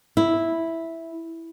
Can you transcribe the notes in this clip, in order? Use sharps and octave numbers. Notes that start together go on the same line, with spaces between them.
E4